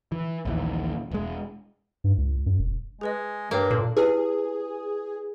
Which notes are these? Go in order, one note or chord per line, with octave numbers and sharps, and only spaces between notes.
E3
A#1 D#2 E3
E1 G#3
G2
C#2
F#2
E1
G#3 G#4 B4 D#5
G2 A#3 G4 C#5 G5
A#2 A4 A5
E4 G4 G#4 B4